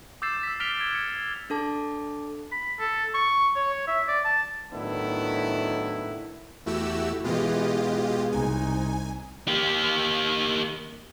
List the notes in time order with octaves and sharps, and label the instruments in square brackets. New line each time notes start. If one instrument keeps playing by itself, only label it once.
[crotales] D6 E6 G6 A6 C7 E7
E6 B6
F6 A6 B6 D7 F7 G7
G#6
C#7
[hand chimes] D4 A4 A5 D6
[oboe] B5
A4
C#6
C#5
E5
D5
A5
[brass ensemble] A2 D#3 F#3 B3 D4 E4
[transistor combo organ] E2 A3 E4 [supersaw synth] F#4 G4 E6
[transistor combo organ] B2 G#3 [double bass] E3 [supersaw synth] F4 G4 D#5
[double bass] C2 D#4 [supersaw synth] G#5
[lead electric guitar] A#3 G4